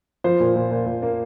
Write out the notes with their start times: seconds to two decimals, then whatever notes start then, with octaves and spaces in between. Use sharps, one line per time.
0.24 F3 C5
0.40 A#2
0.56 A#2
0.71 A#2
0.86 A#2
1.02 A#3